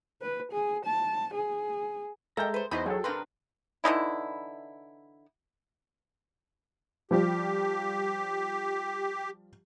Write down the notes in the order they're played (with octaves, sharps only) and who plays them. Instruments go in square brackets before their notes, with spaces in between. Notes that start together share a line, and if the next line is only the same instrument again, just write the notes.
[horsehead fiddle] B4
G#4
A5
G#4
[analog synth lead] G#3 [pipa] A#3 G5 [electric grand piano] A4 E5 G6 [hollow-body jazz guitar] A#5
[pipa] B4 C5
[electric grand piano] E2 [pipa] D#4 E4 F#4 [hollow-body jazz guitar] C5 B5 [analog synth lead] D#5
[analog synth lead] F#3 [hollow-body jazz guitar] G#4 [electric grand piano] A4 G5
[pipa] C4 G4 B4 [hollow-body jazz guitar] D4 F5 C6 [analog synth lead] A#4
[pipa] D3 E3 D#4 E4
[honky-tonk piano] F3 G3 [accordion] G4